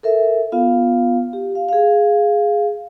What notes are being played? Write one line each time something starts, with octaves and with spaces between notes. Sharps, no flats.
A4 A#4 E5
B3 F4 F5
G4
F5
G#4 F5